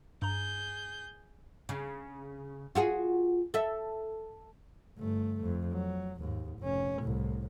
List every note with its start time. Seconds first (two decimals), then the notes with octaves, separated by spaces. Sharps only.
0.22 G2 G#4 A#5 G6
1.69 C#3
2.75 F4 F#4 G#4
3.54 A4 E5
4.98 G1 A3
5.43 F2
5.72 F#3
6.19 D#2 G#2
6.60 F1 C#4
6.99 C2 A2